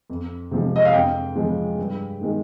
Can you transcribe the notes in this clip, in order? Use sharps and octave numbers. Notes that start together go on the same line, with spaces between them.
F2
C3 F3 G#3
D#5
F5
F2 G5
C#3 F3 G#3
G2
D#3 G#3